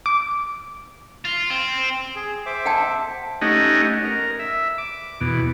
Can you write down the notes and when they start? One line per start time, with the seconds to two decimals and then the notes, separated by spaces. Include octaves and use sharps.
0.06 D6
1.25 F4
1.50 C4
2.16 G#4
2.46 C5 E5 D6
2.66 F#5 G5 A5
3.42 A3 C#4 D#4 G4 D#5 F#5
4.05 A#4
4.39 E5
4.78 D6
5.21 E2 B2